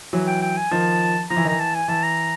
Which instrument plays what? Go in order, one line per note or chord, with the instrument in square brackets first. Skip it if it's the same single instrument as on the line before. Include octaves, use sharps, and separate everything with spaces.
[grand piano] E3 F#3
[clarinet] G5
G5
G#5
[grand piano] D#3 F3 [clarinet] A5
[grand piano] F3 [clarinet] A#5
[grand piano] E3
D#3
[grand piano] E3 [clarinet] A#5
[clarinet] A5
G#5
[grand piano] E3 [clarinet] A5
[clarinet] A#5